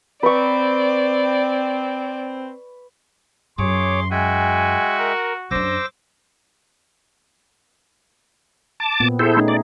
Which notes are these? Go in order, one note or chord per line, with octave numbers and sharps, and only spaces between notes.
C4 B4 D5 C#6
F#2 G#4 C#5 C6 D6
G#3 F#4 E5 G5 G#5
A#4
F#2 D4 C5 D6 E6 A#6
A5 D6
A#2 B3 C4
E4 G#4 A4 C5
A3 C#4 D#4
D5